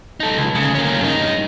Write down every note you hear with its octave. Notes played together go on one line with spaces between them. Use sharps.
D#4 A4
C#2
D2 C#3
A#3 C#4
G2 D#4